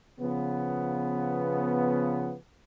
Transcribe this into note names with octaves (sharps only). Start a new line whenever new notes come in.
C#3 F3 B3